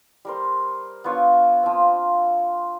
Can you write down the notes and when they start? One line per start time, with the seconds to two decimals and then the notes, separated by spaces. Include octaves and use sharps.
0.25 G3 A#4 C5
1.04 B3 D4 F4 C#5
1.63 F3 C4